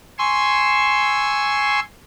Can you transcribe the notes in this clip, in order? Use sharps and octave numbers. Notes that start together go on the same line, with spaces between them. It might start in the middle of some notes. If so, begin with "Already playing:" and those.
G#5 C6 C#6 E6